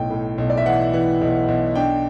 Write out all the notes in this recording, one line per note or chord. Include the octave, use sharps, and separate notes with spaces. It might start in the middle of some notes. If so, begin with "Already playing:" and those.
Already playing: B1 A2 G5
A2
B1
D5
E5
E3 F#5
E3
B1
B1
D4 G5